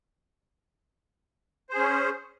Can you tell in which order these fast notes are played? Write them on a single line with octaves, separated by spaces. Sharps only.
C5 G#4 C#4